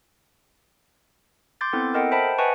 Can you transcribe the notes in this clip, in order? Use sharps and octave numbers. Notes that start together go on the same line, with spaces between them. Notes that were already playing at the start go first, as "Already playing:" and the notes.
C6 D6 G6 A6
B3 C4 E4 A4
A4 A#4 D#5 F#5 G5
C5 E5 G5 A5 B5
B4 D#5 F#5 G#5 A5 C#6